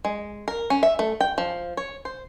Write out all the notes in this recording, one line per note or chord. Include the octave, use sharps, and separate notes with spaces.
G#3
A#4
C#4
E5
A3
G5
F3
C#5
C5